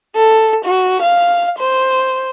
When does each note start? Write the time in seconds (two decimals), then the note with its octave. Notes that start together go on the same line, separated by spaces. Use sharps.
0.16 A4
0.65 F#4
1.03 F5
1.59 C5